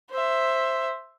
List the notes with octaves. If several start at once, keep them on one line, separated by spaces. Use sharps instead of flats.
C5 E5